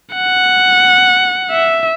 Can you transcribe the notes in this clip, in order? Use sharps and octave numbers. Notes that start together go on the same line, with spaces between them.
F#5
E5